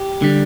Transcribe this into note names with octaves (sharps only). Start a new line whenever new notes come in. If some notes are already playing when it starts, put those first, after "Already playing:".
Already playing: G4
D3 G3